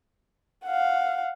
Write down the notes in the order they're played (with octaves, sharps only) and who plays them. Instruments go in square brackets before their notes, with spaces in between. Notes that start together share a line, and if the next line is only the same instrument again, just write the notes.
[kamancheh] F5 F#5